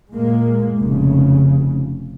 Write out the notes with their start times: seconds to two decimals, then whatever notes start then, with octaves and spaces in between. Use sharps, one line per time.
0.14 A#2 G#3 A#3
0.79 F1 C#3